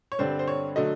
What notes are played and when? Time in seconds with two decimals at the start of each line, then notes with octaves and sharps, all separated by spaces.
0.12 C#5
0.19 G2 D3 G3 C4 C5
0.39 C5
0.48 C#5
0.76 D3 F#3 A3 D#5